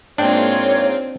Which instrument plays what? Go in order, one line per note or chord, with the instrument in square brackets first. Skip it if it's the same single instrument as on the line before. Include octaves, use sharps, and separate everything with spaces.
[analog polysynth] G#2 A#3 [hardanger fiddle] C4 F4 [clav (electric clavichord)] D4 G5 [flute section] C#5